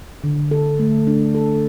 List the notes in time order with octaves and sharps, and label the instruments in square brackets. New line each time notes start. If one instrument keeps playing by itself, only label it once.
[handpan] D3
A4
A3
D4
A4